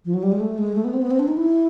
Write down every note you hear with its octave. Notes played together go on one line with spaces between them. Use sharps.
F3
F#3
G3
G#3
A3
G#3
A3
B3
C4
B3
C4
D4
D#4
E4